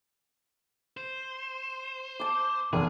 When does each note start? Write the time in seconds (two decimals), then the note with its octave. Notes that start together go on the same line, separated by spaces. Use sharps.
0.97 C5
2.20 A5 D6
2.73 F1 E2 G#4